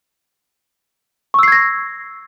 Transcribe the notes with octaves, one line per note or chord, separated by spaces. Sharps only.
C#6 E6 G#6 A#6 C7